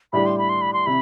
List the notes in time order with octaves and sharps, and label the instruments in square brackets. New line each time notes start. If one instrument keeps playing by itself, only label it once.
[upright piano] A2 G3 D4 G4 [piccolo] B5
[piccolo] C6
B5
C6
B5
C6
[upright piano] C3 [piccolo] B5